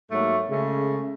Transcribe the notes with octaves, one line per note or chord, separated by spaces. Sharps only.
G#2 F#3 A3 A#3
C#3 G#3 A3 C#4